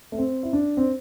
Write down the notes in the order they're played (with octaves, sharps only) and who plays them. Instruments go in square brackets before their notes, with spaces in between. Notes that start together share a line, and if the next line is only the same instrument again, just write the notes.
[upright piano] A3
C4
E4
D4
C4